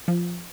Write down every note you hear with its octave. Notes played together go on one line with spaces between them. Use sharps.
F3